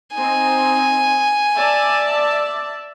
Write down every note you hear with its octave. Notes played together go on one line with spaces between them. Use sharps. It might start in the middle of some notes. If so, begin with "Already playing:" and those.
C4 D#4 G#5
D5 E5 A5